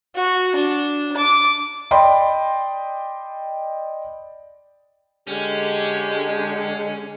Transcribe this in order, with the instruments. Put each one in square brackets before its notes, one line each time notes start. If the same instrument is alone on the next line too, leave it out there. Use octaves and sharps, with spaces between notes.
[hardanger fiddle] F#4
D4
D6
[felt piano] D5 D#5 G5 B5 C6
[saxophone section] D3 G#3 [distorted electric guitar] C#4 [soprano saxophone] G4